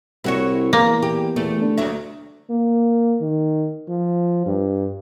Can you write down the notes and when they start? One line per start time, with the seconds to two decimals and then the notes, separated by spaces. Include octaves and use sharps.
0.24 C2 E4 F#4 C#5
0.73 E2 A#3
1.03 G4
1.36 E2 A3
1.61 D3
1.78 D2 F#3 E5
2.50 A#3
3.21 D#3
3.88 F3
4.46 G2